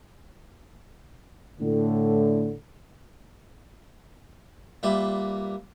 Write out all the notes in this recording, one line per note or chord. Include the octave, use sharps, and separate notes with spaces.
A2 D3
A#2 G3 B4 E5